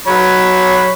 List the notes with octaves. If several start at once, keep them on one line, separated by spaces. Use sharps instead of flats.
F#3 C#5 B5